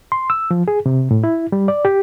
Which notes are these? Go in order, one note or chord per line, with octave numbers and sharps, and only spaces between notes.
C6
E6
F3
G#4
C3
A2
E4
G3
D5
G4